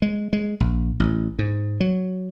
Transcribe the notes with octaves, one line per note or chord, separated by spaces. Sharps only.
G#3
G#3
A#1
A1
G#2
F#3